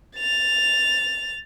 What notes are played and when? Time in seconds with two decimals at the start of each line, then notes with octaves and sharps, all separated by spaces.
0.17 A6 F7